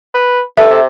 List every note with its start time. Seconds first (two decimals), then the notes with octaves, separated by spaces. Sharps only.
0.14 B4
0.57 G2 A4 E5
0.70 C3